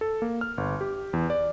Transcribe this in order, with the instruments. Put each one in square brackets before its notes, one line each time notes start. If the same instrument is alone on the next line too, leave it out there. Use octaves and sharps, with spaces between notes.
[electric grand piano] A4
A#3
F6
G1
G4
E2
D5